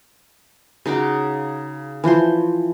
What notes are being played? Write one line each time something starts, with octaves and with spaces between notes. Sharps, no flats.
C#3 D#4 F#4 D6
E3 F3 C5 C6